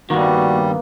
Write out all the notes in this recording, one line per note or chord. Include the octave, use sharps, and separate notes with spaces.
G2 D#3 G3 A#3 B3 F#4